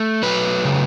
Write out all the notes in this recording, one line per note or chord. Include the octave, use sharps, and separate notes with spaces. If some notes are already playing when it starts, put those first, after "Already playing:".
Already playing: A3
F#3 B4
C#3